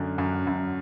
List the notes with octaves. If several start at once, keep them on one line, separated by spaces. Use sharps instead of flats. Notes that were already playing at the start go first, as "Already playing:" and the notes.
Already playing: F#2 D3
F#2
F#2